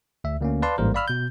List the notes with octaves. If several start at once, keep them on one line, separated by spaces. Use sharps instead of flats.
D2 E5
D2 A#3 C#4
B4 D5 F5 A5 C6
A1 G#2 G3 A#3 A#4 C5
D5 F5 B5 E6 F6
B2 G6